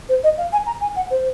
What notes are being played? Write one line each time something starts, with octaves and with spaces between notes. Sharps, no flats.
C5
D#5
F5
G#5
A#5
G#5
F#5
C5